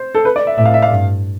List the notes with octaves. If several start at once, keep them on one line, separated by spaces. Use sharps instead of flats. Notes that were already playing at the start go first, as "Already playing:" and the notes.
Already playing: C5
A4
B4
D5
E5
A2 E5
F5
E5
F5
G2